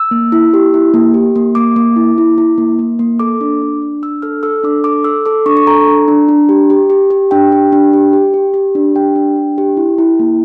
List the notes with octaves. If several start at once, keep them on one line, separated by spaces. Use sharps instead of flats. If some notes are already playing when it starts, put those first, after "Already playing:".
Already playing: E6
A#3
E4
G4
E4
A#3
G4
A#3
A#3 D6
A#3
E4
E4
E4
A#3
A#3
A#3
A4 D6
D4
D4
D4
D4 E6
A4 F6
A4 E6
D4 D6
A4 D6
A4 E6
A4 D6
D4 C#6
C#6
A4 A#5
D4
D4
D4
G4
G4
G4
G4
D4 G5
G4
D4
G4
G4
G4
G4
D4
G4 G5
D4
D4
G4
E4
E4
A#3